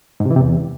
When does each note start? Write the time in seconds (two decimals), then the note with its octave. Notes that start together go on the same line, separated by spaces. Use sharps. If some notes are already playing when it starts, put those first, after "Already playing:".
0.20 G#2
0.25 C3
0.31 E3
0.36 C3
0.41 E2